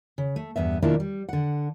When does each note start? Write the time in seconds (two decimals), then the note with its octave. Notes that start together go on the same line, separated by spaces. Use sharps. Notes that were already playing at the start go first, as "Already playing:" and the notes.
0.18 C#3
0.36 A3
0.56 E2 G2 B3 E5
0.82 B2 D#3 F3 A#3 D4 E4
1.00 G3
1.29 D3 F#5